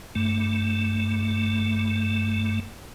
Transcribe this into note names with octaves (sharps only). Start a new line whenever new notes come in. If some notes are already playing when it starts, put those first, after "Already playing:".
G2 A3